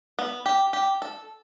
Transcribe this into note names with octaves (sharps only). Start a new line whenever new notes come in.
B3
G4
G4
A4